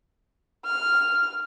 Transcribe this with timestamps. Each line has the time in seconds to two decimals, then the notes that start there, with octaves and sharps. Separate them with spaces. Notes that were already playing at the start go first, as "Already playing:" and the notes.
0.66 F6